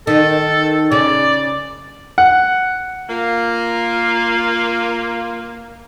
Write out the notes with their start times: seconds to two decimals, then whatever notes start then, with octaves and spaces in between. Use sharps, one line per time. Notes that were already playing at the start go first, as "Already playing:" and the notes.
0.07 D#3 A4
0.92 C#3 D5
2.18 F#5
3.08 A#3 F4